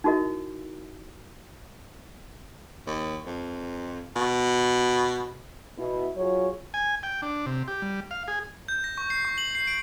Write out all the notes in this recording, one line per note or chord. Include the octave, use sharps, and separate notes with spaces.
D#4 E4 F#4 A#4 D#5
D#2
F2
B2
B2 E4
F#3 F4 G#4 C#5
G#5
G5
D4
C3
G4
G3
F5
G#4
G6
A#6
C#6
C7
C#6
F#7
C7
D7